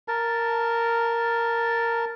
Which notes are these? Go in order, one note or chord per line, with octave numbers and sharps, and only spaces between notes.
A#4 A5